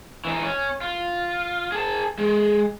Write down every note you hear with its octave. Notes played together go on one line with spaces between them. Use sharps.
E3 D#4
C#4
F4
G#4 A5
G#3